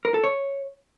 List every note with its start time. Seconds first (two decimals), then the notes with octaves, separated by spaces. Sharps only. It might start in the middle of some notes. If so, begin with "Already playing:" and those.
0.05 A#4
0.14 A4
0.24 C#5